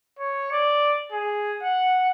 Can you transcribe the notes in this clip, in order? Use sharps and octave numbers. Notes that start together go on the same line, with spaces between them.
C#5
D5
G#4
F#5